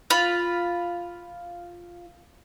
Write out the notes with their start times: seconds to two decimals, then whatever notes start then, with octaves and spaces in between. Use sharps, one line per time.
0.10 F4 B5